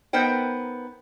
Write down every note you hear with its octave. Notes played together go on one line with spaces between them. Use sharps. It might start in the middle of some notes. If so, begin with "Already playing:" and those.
B3 D#4 A#4 C5 G5